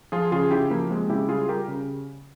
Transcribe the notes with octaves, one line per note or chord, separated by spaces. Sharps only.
F3 F4 G#4
C#3 F4 G#4
C#3 E4 G4
F3 A#3
G#3 C4
C#3 E4 G4
G3 F4 G#4
G3 G4 A#4
C#3